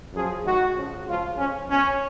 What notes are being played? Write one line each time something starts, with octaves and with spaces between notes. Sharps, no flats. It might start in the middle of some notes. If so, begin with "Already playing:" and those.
F#2 F3 G#4
G#2 D#3 F#4
F2 C#3 F3
C#2 C#3 F3 F4
F2 F3 C#4
C#2 B2 C#4